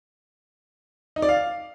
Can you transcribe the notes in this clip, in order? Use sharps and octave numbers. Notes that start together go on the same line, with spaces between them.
D#4
D5
F5